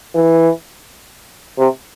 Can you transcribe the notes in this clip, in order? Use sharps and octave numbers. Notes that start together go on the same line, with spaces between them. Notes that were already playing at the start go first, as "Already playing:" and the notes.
E3
C3